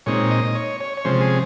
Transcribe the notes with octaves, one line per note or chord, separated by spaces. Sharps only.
A#2 G#3 C4 D#4 C#5
D#5
C#5
C#5
C#5
C3 F3 G#3 C#4 C5
G#4